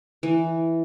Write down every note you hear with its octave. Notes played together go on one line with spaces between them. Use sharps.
E3